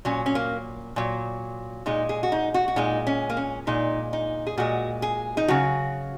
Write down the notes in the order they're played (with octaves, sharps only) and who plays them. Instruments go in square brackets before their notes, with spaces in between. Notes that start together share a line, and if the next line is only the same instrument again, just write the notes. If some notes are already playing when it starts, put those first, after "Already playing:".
[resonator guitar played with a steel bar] A#2 F#3 C#4
C#4
A#3
A#2 F#3
A#2 G#3 D#4
G#4
F#4
D#4
F#4
F#4
A#2 G#3 D#4
C#4
A#3
C#4
A#2 G#3 D#4
D#4
G#4
A#2 G#3 F#4
G#4
D#4
C#3 F#3 F#4